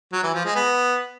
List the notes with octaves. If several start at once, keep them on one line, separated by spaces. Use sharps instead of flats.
F#3
E3
F3
G#3
B3